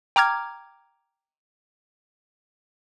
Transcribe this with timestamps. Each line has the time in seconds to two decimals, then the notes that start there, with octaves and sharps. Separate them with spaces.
0.16 G5 A#5 D6 F6 G#6